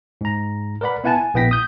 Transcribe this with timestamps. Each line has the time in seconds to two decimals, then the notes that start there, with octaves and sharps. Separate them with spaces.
0.21 G#2 A#5
0.81 A#4 B4 D5 F#5 B5
1.04 B3 E4 F#5 G#5 A5
1.18 G#5
1.34 A#1 B3 E4 G5 A#6 B6
1.51 D#6 G6